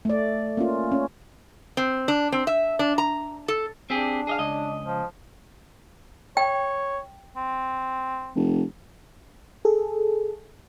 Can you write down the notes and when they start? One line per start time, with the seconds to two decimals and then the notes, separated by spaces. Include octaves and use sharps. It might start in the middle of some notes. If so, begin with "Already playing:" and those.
0.05 A3 D5
0.57 A#3 C#4 F4
0.92 C#4
1.77 C4
2.08 D4
2.32 C4
2.47 E5
2.79 D4
2.98 A#5
3.48 A4
3.90 C4 D4 G4 G#4
4.27 G#4 D#5 F5
4.39 C#2 D#5
4.84 F3
6.37 C#5 G5
7.36 C4
8.36 F1
9.65 G#4 A4